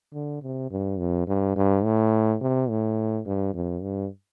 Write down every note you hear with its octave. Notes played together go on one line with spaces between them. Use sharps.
D3
C3
G2
F2
G2
G2
A2
C3
A2
G2
F2
G2